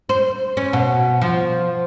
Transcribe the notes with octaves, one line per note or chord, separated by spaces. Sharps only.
C5
C#4
B2
F3